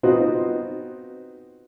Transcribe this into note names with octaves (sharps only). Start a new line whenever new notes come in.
B3 C4 D#4 F4 F#4